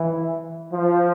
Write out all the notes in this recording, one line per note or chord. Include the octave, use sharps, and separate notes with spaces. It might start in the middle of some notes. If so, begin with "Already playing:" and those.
Already playing: E3
F3